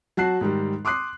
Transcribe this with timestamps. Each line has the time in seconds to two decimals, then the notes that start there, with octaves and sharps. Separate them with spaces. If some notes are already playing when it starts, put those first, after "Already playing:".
0.17 F#3 F#4 A5 F#6 C7
0.41 G#2 D#3 G3
0.85 C6 D6 D#6 F#6 C7